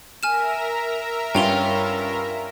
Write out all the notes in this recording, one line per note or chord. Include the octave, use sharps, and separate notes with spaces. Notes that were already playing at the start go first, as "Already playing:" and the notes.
A#4 E5 G#5 A#5 F6 E7
G2 C#4 F4 G5 F7 G7